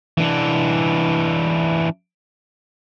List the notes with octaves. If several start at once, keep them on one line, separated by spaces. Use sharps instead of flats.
E3 D4